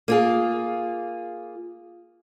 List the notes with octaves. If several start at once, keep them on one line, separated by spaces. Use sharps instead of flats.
A#3 F4 G#4